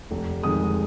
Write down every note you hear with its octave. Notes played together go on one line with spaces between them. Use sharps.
F1
F2 D#3 G#3 D#6